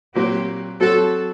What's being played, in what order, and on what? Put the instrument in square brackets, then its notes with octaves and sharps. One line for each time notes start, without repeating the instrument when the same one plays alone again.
[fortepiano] A#2 F#3 C4 F#4 [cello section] G4
[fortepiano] F#3 C4 F#4 [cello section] A4